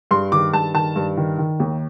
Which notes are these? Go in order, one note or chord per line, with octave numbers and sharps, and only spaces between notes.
G2 C6
D#3 D6
G2 A5
D#3 A5
G2
D#3
D#3
D#2